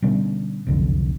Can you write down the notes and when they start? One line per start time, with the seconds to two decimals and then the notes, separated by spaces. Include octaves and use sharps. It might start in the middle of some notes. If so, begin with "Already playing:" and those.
0.02 B2 D3 G3 C#4
0.67 F#1 C2 F2 D3